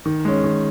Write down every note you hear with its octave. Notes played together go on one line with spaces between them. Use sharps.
D#3
G#3 C#4
D#3